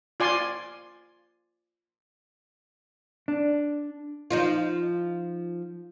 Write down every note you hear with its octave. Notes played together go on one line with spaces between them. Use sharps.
F4 D5 G#5 C6
D4
F3 D#4 F4